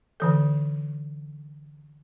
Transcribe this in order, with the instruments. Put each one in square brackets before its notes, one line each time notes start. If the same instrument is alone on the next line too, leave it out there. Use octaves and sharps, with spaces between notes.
[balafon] D3 E3 A4